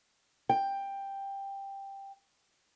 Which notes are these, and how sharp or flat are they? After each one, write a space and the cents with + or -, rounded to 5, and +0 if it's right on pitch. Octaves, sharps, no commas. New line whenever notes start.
G5 +10